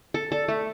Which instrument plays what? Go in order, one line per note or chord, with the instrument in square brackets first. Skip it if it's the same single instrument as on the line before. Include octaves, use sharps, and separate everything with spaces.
[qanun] A4
[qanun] A4 [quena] D5
[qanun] A3 [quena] E5